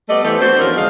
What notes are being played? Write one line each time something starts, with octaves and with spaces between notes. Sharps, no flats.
G3 A3 B3 D5 D#5
E3 A3 B3 G4 B4 C5
C4 D4 F#4 A4 C5
E2 F3 C#4 D4 A#4
E2 D3 G#3 C4 D#5 F5